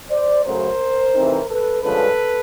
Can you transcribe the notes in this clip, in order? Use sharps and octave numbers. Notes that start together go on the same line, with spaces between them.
C5 D5
F#2 C#3 F#3 A3 A#4 C5
C3 E3 A3 C4 D#4
A4 B4
G2 D3 F3 G#3 C#4 A4 B4